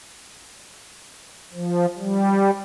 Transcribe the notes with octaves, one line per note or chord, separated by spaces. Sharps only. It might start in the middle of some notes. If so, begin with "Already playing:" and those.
F3
G3